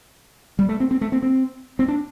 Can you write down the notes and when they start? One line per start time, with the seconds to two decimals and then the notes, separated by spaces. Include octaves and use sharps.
0.59 G3
0.69 A3
0.80 C4
0.91 C4
1.01 A3
1.12 C4
1.22 C4
1.79 C4
1.88 D4